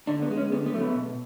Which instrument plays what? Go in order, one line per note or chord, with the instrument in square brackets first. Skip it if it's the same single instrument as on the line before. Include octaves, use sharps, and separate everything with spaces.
[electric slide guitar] D3 D4
B3
G#3
C#4
D3 B3
B3
F#3 A3
B3
B2